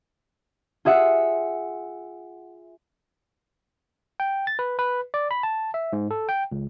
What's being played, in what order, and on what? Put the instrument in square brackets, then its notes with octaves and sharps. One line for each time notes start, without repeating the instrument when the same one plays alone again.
[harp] F4 G#4 E5 F#5
[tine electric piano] G5
A6
B4
B4
D5
B5
A5
E5
G#2
A4
G5
C#2